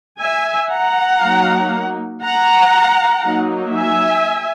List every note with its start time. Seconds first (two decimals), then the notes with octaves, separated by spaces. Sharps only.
0.20 E5 G#5
0.71 F#5 A#5
1.22 F#3 A#3 D#4
2.24 F#5 A#5
3.26 F#3 A#3 D#4
3.77 E5 G#5